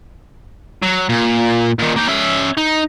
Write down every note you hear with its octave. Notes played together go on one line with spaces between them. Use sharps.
F#3
A#2
A#2 D#3
A#3 G5
C#4 E5
D#4